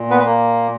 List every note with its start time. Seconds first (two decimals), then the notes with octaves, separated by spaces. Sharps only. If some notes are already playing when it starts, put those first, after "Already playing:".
Already playing: A#2
0.10 B3 B4
0.25 A#3